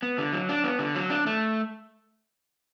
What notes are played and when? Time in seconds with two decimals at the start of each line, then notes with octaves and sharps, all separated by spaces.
0.02 B3
0.18 D3
0.33 F#3
0.49 D4
0.64 B3
0.79 D3
0.95 F#3
1.10 D4
1.26 A3